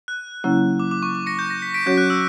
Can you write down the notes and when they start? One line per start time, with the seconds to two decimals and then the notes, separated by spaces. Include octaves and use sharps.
0.08 F#6
0.44 C#3 F#3 A#3 C#4 E4
0.80 D6
0.91 D6
1.03 C#6
1.15 D6
1.26 A#6 C#7
1.39 G6
1.50 A#6
1.62 B6
1.74 B6 D7
1.86 F#3 C#4 F#4 C#5 G6
1.98 F#6
2.10 E6